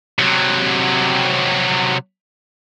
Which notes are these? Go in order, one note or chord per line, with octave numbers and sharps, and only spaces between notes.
C3 F#3